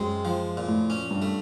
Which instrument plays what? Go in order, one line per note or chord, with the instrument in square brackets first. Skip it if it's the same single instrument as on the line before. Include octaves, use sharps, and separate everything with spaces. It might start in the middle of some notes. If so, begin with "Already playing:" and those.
Already playing: [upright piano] F#2 [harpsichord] G#3 C4
[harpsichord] F3
A#2
[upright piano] A2
[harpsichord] C#4
[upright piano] G2
[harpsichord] A3